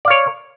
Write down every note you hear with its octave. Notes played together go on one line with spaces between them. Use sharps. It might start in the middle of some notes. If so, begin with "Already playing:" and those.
C#5 D5 F5